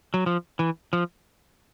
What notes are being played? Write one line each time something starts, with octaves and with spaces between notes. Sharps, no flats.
F#3
F3
E3
F3